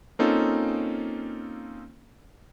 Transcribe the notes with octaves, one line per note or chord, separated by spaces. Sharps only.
A#3 C4 C#4 D#4 F4 A4